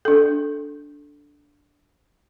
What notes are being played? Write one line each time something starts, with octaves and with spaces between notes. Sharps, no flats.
D4 A4